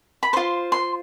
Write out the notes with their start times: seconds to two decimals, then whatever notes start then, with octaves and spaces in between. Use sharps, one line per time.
0.23 B5
0.33 F4 C5 C6
0.72 C6